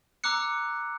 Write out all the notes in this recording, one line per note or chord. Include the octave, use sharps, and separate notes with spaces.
A#5 D6 E6 F#6 C#7